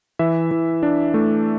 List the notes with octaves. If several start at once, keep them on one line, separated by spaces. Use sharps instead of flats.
E3 E5
E3
D4
A3